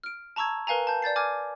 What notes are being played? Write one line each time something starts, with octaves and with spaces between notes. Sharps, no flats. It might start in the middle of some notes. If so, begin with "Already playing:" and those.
F6 D7
A5 A#5 C#6 E6 G#6
A#4 B4 F5 G#5 A#5
A5 G6
D5 G6 A6 C7
G#5 D6 F6 G#6